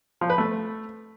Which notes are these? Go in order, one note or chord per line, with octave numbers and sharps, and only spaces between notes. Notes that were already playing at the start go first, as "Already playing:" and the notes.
F3
B4
A3